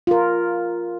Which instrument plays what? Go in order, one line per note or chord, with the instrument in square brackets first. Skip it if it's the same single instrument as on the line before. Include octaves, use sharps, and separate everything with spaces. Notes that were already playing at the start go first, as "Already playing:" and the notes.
[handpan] F4 A#4